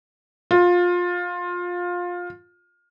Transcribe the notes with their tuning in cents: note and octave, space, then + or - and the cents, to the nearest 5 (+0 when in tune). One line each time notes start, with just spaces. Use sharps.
F4 +20